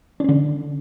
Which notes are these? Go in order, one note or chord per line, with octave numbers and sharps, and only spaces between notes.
D3 C#4 D4